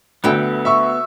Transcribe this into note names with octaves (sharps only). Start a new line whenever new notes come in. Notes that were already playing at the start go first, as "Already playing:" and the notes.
D2 D3 B3 E4 A4 G5
E5 C#6 E6